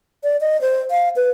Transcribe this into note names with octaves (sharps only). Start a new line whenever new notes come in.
D5
D#5
C5
F5
B4